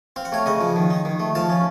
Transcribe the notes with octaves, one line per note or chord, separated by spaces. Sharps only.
C4 F5
F#5
A3 C#5 F5
C#3 D#5 F#5
F3
D#3
D#4
D#3
A3
F3 F5 A5
C#4